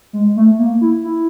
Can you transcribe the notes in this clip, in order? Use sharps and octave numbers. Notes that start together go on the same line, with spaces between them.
G#3
A3
A#3
E4
E4